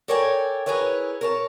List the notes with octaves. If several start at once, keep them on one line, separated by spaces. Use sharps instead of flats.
A4 A#4 C#5 D5 G5 G#5
E4 G#4 A#4 B4 C#5 E5
A#4 C#5 A5